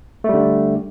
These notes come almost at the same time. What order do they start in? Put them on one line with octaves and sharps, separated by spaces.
A3 G3 D3